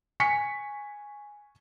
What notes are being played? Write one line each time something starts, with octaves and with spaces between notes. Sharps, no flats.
G#5 C#6 B6 C#7